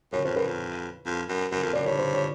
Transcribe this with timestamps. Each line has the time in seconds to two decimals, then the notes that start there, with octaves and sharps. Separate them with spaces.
0.13 F#2 C#5
0.25 F2 C5
0.36 F#2 B4
0.47 F2
1.06 F2
1.29 F#2
1.52 F#2 A#4
1.63 F2
1.73 F#2 D5
1.86 G2 C#5
1.99 C5
2.14 C#5